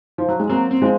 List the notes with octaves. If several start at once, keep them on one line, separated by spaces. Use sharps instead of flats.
F3
F#3
G#3
F#3 A#3 C4
C4
F3 G#3